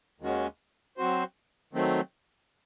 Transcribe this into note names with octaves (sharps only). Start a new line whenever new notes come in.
D#2 D#3 G#3 C#4 F#4
F#3 C4 F#4 C5
D#3 F#3 A3 C4